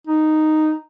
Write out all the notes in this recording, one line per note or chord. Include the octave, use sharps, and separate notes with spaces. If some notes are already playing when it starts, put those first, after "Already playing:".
D#4